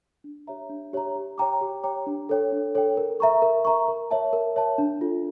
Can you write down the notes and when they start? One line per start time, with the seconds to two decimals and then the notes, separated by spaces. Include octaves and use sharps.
0.24 D4
0.47 G4 C#5 E5 A#5
0.70 D4
0.93 G4 C#5 E5 A#5
1.16 G4
1.38 C#5 G5 A#5 D6
1.61 G4
1.83 C#5 G5 A#5 D6
2.07 D4
2.29 A4 C#5 G5
2.52 D4
2.75 A4 C#5 G5
2.97 A#4
3.20 E5 A#5 C#6
3.42 A#4
3.65 E5 A#5 C#6
3.88 A#4
4.11 C#5 E5 A5
4.33 A#4
4.56 C#5 E5 A5
4.78 D4
5.01 F4 A4